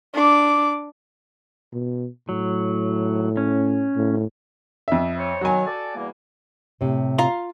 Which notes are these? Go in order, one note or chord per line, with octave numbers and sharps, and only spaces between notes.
D4 D6
B2
A2 F#3
C#4
A2
F2 E5
C5 C#5
D#3 F#3 F#4 G#5
A4 D5
E2 G3 A#3
A2 C3
F4 F5 A#5